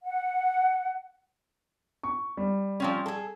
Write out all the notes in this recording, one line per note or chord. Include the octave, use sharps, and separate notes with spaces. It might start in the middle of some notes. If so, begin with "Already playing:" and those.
F#5
C#6
G3
F3 C4 C#4
G#4 A4